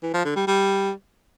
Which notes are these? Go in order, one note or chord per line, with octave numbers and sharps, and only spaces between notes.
E3
F3
D3
G3
G3